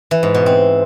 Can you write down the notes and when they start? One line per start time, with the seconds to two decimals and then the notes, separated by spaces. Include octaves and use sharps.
0.11 E3
0.23 G#2
0.35 B2
0.46 C4